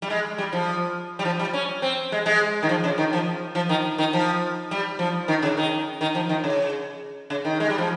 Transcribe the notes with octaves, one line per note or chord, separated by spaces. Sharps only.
G3
G#3
G3
F3
G3
F3
G3
C#4
C4
G#3
G#3
D#3
F3
C#3
D#3
F3
F3
D#3
D#3
F3
G3
F3
D#3
C#3
D#3
D#3
F3
D#3
C#3
C#3
D#3
G#3
G3
F3